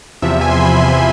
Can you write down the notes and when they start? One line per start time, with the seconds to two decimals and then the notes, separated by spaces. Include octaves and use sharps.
0.22 E2 C3 F3 E5
0.41 G#5
0.51 C6
0.61 B5
0.80 C6